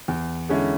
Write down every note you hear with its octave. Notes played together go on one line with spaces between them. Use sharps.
E2
D3 G#3 C#4 E4